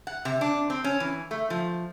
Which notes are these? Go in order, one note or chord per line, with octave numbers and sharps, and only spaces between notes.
F#5
C3
D4
C4
C#4
E3
A3
F3